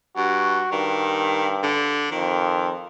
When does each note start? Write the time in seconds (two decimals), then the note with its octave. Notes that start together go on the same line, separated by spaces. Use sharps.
0.17 G2 F#4
0.72 G2 D#3
1.63 D3
2.11 F2 D#3